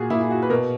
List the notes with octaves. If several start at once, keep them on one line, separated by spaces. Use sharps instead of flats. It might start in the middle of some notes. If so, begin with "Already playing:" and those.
Already playing: A#2 F#4 G#4
A#2 E4
E4
F#4
B4
B2 A#4